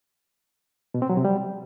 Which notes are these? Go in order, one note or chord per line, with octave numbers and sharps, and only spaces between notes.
B2
C4
F#3
C3
G3